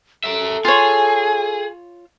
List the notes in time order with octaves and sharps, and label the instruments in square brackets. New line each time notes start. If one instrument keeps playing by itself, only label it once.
[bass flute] A4 [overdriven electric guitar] A#4 E5
[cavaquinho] F4 C#5 [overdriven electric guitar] G#4 [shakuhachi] G#5